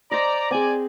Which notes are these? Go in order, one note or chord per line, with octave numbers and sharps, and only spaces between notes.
C5 D5 D#5 A#5
C4 G#4 D5 G#5